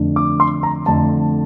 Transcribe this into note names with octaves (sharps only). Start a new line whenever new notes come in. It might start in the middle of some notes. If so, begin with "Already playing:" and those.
Already playing: F2 D3 A3 D4
D6
C6
A#5
F2 D3 A3 D4 A5